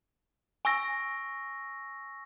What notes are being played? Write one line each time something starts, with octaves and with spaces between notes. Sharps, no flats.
G#5 C#6 E6 A#6